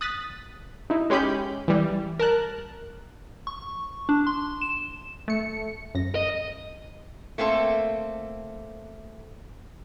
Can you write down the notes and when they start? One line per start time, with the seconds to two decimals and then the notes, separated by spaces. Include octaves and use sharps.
0.01 D#6 F#6 A6 B6
0.90 D#4 E4
1.10 G#3 C#4 G4 B5 G6
1.68 E3 G3
2.19 A#4 A5 F#6
3.47 C#6
4.09 D4
4.27 C6
4.61 E7
5.28 A3 C#7
5.95 F#2 A#6
6.15 D#5
7.38 A3 A#3 C4 A4